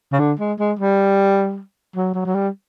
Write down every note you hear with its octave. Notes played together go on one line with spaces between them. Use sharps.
C#3
D3
G#3
G#3
G3
F#3
F#3
F#3
G3